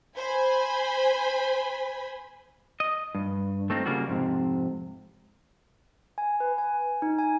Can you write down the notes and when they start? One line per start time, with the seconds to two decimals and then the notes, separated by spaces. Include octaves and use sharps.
0.16 C5 G#5 B5
2.80 D#5
3.15 G2
3.70 A3 C4 D#4 F4
3.86 C#3 G3 A#3 F4 F#4
4.07 F2 G#2 C3
6.18 G#5
6.40 B4
6.58 G#5
7.02 D#4
7.18 G#5